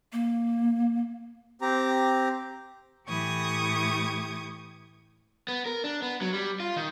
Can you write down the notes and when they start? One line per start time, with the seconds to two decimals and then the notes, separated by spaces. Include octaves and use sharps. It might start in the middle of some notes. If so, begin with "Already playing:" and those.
0.13 A#3
1.61 C4 G4 A#5
3.07 A2 E3 G4 C#6 D#6 G#6
5.48 B3
5.66 A#4
5.84 D4
6.02 B3
6.21 F#3
6.33 G3
6.60 F4
6.76 D#3